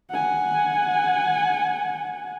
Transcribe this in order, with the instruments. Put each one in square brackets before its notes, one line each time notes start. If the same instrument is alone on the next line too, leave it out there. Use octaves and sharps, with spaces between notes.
[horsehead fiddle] F#5 G#5